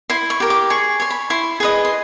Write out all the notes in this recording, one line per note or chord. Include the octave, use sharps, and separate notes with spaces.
E4 C6
C#6
G4 A#4
D6
G#4 C#6
C#5 C6
B5
E4 C6
G#4 B4 D#5
C6